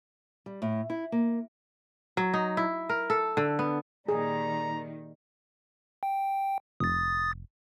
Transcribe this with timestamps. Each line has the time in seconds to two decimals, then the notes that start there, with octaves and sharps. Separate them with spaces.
0.46 G3
0.62 A2
0.90 E4
1.12 A#3
2.17 F#3
2.34 D#4
2.57 E4
2.89 A#4
3.10 A4
3.37 D3
3.59 B3
4.08 A#2 D#3 G3 G#4 A#5
6.03 G5
6.80 F1 D#6 A6